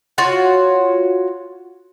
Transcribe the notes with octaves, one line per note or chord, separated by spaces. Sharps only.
F4 F#4 C#5